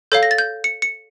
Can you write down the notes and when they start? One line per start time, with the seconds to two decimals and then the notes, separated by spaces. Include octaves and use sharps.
0.12 A4 C#5 F5 G6
0.23 A#6
0.31 A6
0.38 G6
0.64 C#7
0.82 C#7